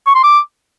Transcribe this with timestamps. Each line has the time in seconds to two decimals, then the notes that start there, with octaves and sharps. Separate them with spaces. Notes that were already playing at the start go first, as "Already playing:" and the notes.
0.07 C#6
0.15 C6
0.24 D6